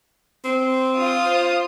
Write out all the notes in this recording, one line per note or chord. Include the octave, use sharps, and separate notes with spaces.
C4
F4 D#6
C5